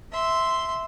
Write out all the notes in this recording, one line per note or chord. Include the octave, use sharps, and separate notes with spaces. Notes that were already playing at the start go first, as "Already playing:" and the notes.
E5 C6